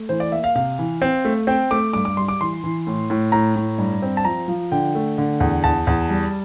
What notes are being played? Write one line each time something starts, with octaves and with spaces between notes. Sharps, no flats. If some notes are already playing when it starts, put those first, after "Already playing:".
Already playing: A3
E3 C5
D5
A#3 E5
F5
C3 F5
E3
C4
A3
C4 G5
A3 D6
G2 D6
D6
G3 C6
D6
E3 C6
E3
A2
A2
A2 A#5
A2
G2
C4
A5
F3 A#5
F3
D3 G5
A3
D3
E2
E2 A5
E2
G3